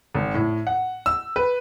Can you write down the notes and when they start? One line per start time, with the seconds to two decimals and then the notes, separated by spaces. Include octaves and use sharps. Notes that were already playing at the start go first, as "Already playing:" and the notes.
0.15 G#1
0.34 A2
0.67 F#5
1.06 E6
1.36 B4